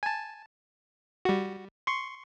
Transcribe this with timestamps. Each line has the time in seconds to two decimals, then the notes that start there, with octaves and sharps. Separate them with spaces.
0.03 G#5 A5
1.25 G3 F#4
1.87 C6 C#6